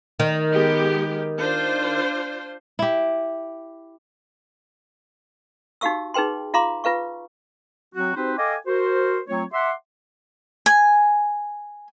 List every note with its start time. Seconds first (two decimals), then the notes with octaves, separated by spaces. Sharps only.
0.20 D#3
0.53 G#3 B3 G4
1.39 D4 F4 C5
2.79 E4 G4
5.81 D#4 F#4 G4 F5 C#6 E6
6.14 D#4 G#4 B4 G5 C6
6.54 F4 F5 A#5 C6 D6
6.84 F4 B4 F5 C#6
7.95 F#3 C4 F#4
8.16 C4 D#4 F#4 G4 B4 C5
8.38 A4 D#5 F5 G5 G#5 D6
8.67 F#4 A#4 C5
9.29 F#3 A3 C4 F4 C#5
9.53 E5 F#5 C6 D6
10.66 G#5